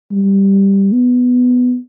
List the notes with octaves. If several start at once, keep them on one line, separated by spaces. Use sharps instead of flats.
G3
B3